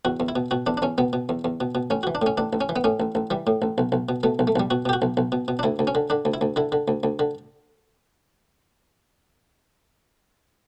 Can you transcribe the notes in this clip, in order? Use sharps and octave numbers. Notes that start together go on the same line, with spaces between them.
E2 F#4
E2
E4
B2
B2 F#4
E2 D4
D4
E2 C#4
B2 B3
B2
E2
E2
B2
B2
A1 C#4
E3 F#4
D4
A2 C#4
A1 D4
A1
C#4
E3
B3
A2 C#4
A1
A1
E3 G3
A2
A1
B1
B1
B2
B2 A3
B1
A3
B1 G3
B2 F#4
B2 G4
F#4
B1
B1
B2
B2
D4
D2 E4
D2
C#4
D3
D3 D4
D2
E4
D2
D3 E4
D3
D2
D2
D3